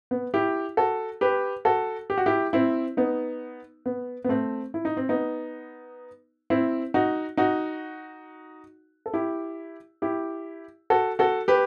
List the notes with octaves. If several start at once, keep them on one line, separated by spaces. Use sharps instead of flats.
B3
E4 G4
F#4 A4
G4 B4
F#4 A4
G4
F#4
E4 G4
C4 E4
B3 D#4
B3
B3
A3 C4
E4
D#4
C4
B3 D#4
C4 E4
D#4 F#4
D#4 F#4
A4
E4 G4
E4 G4
F#4 A4
F#4 A4
G4 B4